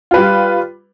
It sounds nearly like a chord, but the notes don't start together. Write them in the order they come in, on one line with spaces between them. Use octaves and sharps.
F4 B4 G3